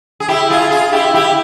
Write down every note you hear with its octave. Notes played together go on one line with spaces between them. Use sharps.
G#4
E4 G4
F4 G#4
F4 G#4
E4 G4
E4 G4